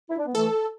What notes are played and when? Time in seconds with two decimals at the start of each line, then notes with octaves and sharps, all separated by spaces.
0.10 E4
0.18 D4
0.26 B3
0.34 E3 A3 A4